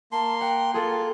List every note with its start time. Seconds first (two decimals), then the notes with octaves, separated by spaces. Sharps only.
0.12 A#3 A5 C6
0.41 F#5 G5
0.74 A#3 F4 G#4 A4 A5